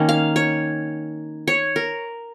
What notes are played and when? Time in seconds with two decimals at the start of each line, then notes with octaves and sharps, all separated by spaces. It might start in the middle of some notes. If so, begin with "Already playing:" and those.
Already playing: D#3 A#3 C#4
0.09 F5
0.36 C#5
1.48 C#5
1.76 A#4